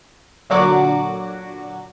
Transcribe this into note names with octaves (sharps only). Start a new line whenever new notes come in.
A#2 D3 F#3 F#4 D6 F#6